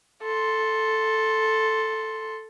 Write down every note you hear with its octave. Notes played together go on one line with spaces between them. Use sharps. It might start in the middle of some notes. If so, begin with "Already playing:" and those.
A4 C6